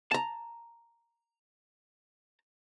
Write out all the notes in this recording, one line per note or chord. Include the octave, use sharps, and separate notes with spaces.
A5 A#5